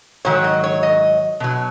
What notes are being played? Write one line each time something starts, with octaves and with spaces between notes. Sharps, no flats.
G#2 D#3 F#3 C#5
D#5
C#5
D#5
B2 F#3